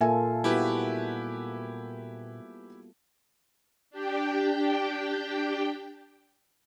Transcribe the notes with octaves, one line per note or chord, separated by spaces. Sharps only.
A#2 A#3 F4 A4 A#4 E5 G#5
G3 B3 E4 F#4 G4 B4
D4 G4 G5